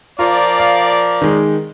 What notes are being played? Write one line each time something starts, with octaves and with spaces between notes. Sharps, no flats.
F3 F4 A#4 D5
F5
D#3 G#3